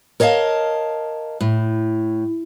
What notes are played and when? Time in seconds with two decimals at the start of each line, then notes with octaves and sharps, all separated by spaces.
0.20 A#4 C#5 D#5 F5 A5
1.41 A2